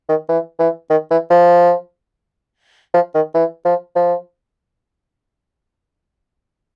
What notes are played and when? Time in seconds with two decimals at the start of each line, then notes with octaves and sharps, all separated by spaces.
0.09 D#3
0.29 E3
0.59 E3
0.90 D#3
1.11 E3
1.30 F3
2.94 F3
3.15 D#3
3.35 E3
3.65 F3
3.96 F3